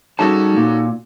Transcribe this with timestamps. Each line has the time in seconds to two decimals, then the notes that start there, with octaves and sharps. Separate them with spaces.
0.19 G3 C#4 D#4 F#4 G#4 A4 A5
0.57 A#2